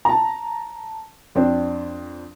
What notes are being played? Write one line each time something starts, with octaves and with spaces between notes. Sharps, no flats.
A5 A#5
F2 C4 D4